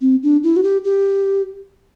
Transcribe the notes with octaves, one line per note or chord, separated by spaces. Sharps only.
C4
D4
E4
F#4
G4
G4